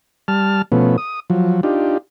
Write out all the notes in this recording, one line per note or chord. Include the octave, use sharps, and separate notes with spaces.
G3 A5 F6
B2 F3 A3 B3 C#4
D#6
F3 F#3
D4 D#4 F4 G4